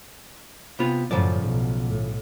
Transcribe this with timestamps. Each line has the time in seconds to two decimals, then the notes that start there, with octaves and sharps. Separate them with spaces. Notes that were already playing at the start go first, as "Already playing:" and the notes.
0.79 C3 B3 F4
1.11 F#2 A2 C#3 F3 D5
1.43 B1
1.87 B1 A2